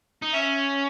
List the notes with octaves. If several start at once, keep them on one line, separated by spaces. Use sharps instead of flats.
D#4
C#4 E5